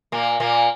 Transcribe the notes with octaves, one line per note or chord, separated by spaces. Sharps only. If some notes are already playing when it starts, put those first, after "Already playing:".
A#2 A#3
A#2 A#3